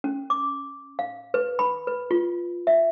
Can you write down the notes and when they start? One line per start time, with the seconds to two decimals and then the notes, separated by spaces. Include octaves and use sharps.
0.04 C#4
0.30 D6
0.99 F5
1.34 B4
1.59 B5
1.87 B4
2.11 F4
2.67 E5